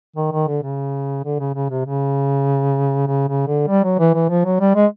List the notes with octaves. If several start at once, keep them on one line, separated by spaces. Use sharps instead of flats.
D#3
D#3
D3
C#3
D3
C#3
C#3
C3
C#3
C#3
C#3
D3
G3
F#3
E3
E3
F3
F#3
G3
G#3